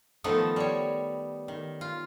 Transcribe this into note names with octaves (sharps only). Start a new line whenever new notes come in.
D#3 F3 A3 B3 D#4 A4
G3 C#5
D#3
F4